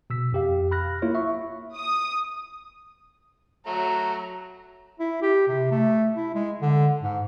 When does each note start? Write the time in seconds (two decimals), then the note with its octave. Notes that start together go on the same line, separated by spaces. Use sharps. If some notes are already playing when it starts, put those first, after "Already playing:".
0.10 B2 E6 B6
0.33 F2 G4 F5
0.71 B5 F6 F#6 A#6
1.02 A#3 E4 F4 C#5
1.15 E5 C#6
1.75 D#6
3.67 F#3 A3 A#5
5.00 E4
5.22 G4
5.48 C3
5.72 A3
6.17 E4
6.35 G#3
6.62 D3
7.02 G#2